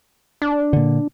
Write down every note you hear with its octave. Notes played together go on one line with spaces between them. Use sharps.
D4
A#2 D3